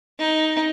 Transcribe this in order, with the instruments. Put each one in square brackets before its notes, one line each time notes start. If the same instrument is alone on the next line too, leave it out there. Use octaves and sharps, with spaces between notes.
[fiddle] D#4